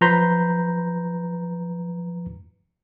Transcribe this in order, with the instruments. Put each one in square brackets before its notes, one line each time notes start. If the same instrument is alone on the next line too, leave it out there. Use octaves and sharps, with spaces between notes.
[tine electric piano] F3 B4 A#5 C6 G6 B6